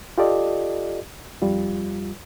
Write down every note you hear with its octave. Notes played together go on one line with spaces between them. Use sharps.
F4 G4 A4 D5 D#5
F2 G3 F4